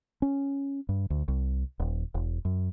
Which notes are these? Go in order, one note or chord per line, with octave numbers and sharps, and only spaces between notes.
C#4
G2
D2
C2
D#1
E1
F#2